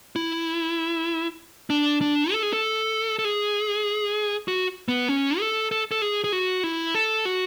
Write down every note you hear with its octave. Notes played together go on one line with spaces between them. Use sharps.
E4
D4
D4
A4
G#4
A4
A4
G#4
F#4
B3
C#4
A4
A4
A4
G#4
G#4
F#4
E4
A4
F#4